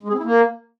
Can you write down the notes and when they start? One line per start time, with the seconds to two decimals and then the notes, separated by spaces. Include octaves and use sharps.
0.03 G#3
0.08 G#4
0.13 C4
0.18 E4
0.24 A#3